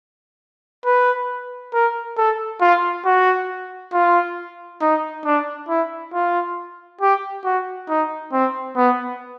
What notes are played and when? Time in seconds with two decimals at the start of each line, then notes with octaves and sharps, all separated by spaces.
0.85 B4
1.74 A#4
2.17 A4
2.61 F4
3.06 F#4
3.93 F4
4.82 D#4
5.25 D4
5.69 E4
6.14 F4
7.01 G4
7.45 F#4
7.89 D#4
8.32 C4
8.76 B3